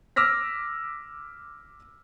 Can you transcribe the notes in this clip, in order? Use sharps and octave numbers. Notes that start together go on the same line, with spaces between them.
D6 E6 F6 A#6 B6